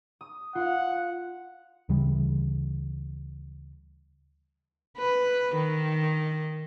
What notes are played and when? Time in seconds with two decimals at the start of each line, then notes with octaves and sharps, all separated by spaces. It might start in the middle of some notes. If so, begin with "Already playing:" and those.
0.21 D#6
0.55 F4 F5 F#5
1.89 D2 C#3 E3 G3
4.97 B4
5.55 D#3